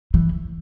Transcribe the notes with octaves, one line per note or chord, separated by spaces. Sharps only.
E3